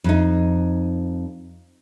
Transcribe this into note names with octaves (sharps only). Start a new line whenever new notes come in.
F2 D#4